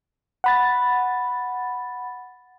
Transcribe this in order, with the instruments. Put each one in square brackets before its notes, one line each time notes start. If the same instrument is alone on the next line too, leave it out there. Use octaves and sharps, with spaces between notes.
[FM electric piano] F#5 B5 A6